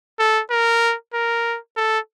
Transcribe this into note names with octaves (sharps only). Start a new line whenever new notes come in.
A4
A#4
A#4
A4